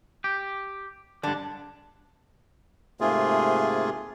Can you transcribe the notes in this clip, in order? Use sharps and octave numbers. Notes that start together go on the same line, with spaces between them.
G4
G2 D3 D4
G#2 C3 A3 A#3 F4 G#4